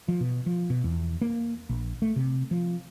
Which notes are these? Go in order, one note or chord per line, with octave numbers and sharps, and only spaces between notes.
F3
B2
F3
B2
E2
A#3
A#1
A3
C3
F3